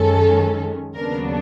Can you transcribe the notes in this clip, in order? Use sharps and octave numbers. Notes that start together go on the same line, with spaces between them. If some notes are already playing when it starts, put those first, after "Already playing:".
Already playing: F#2 D#3 G#3 C#4 A4
D#2 C#3 F#3 B3 D4 A#4